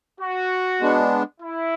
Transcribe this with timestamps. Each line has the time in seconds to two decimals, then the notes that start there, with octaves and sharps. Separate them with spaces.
0.20 F#4
0.80 G#3 B3 D4
1.41 E4